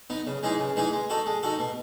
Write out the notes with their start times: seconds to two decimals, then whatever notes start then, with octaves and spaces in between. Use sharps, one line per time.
0.10 B3 D#4
0.27 C#3
0.43 E3 G#3 D#4 G#4
0.60 C#3
0.76 E3 G#3 D#4 G#4
0.93 G#3
1.10 D#4 F#4 A4
1.26 G#3
1.43 D#4 F#4 A4
1.59 B2